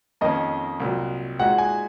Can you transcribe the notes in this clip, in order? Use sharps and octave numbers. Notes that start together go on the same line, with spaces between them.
F2 D#3 A#3 C#4 D#5
C2 A#2 F#3
A#2 G#3 D#4 F#4 F#5
G#5